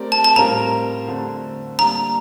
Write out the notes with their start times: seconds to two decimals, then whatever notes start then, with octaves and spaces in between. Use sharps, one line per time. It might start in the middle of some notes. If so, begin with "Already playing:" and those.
Already playing: A3 C4 G4 A#4 D5
0.12 A5
0.24 A5
0.36 A2 G3 C4 F4 A#4 A#5
1.08 D3 A3 C4
1.78 G3 A#3 D4 A#5